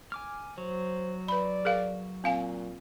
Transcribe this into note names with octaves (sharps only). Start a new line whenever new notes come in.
G#5 D6 F6
F#3 C5
B4 D5 B5
G#4 A#4 F5
A#2 C4 F5 G#5